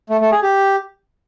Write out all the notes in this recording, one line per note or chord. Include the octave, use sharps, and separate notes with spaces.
A3
A3
G#4
G4